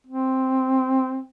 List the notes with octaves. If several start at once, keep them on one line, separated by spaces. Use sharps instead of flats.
C4